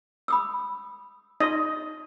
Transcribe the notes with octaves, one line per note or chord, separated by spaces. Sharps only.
B5 D#6 E6
D#4 D5 D#5 C6